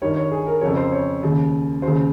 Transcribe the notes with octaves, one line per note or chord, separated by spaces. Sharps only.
G2 D#3 C#5
C#5
G#4
A#4
F2 C#3 C#5
C5
C#5
D#2 C#3
D#2 C5
C#3